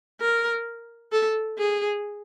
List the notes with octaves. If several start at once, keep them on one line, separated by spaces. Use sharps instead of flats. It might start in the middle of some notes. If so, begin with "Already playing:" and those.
A#4
A4
G#4